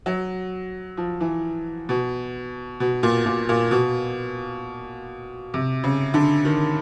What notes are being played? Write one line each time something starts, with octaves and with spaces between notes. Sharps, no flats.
F#3
F3
E3
B2
B2
A#2
A#2
A#2
B2
C3
C#3
D3
D#3